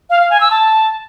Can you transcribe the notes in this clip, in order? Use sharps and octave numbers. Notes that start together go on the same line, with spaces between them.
F5
F5
G#5
E6
A5